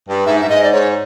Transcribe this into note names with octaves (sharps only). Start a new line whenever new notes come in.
G2
G#2 E5
G2 E5
G#2 D#5
D5
G#2 C#5